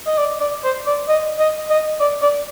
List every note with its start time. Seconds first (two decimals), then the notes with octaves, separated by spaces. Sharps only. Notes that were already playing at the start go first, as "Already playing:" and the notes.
0.07 D#5
0.18 D5
0.40 D5
0.64 C5
0.86 D5
1.09 D#5
1.39 D#5
1.70 D#5
2.00 D5
2.22 D5